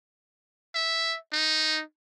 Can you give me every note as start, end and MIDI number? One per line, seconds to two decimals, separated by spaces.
0.75 1.17 76
1.33 1.82 63